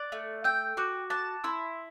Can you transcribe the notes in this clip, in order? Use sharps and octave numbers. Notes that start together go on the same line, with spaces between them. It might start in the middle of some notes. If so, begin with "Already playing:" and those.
Already playing: D5 F#6 A6
A3
G5 E6 G6
F#4 D6 F#6
A5 D6 F#6
E4 C6 E6